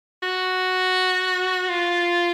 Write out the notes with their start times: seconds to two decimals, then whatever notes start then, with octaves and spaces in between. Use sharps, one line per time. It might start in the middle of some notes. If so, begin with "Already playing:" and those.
0.23 F#4
1.69 F4